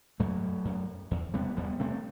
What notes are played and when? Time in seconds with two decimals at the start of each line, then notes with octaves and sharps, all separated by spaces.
0.20 F#2 F#3 A3
0.65 F#2
1.11 E2
1.34 C3 G3 B3
1.57 E2 G3 B3
1.80 C3 A3 C4